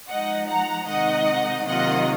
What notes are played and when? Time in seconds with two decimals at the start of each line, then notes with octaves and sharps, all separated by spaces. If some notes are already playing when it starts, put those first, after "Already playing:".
0.09 F3 G#3 D#4 D#5 F#5
0.48 F#5 A#5
0.87 C3 D#3 G#3 D#4 D#5 F#5
1.65 C3 D#3 F#3 A#3 F4 D#5 F#5